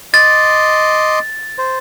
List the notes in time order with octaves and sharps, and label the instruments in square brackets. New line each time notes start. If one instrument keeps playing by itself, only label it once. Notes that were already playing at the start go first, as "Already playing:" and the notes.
[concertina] D#5 C6 D6 [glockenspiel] A6
[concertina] C5